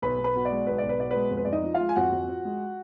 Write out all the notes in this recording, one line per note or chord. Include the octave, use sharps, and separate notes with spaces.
B1 B4 B5
B1
B4 B5
B2
D5
G#3
B1 B4
B1 D5
B4
B2 D5
G#3 B4
F2
B4
F2 D5
D#4 D#5
F3
F4 F5
G#3
G#5
F2 F#4 F#5
F2
F3
G#3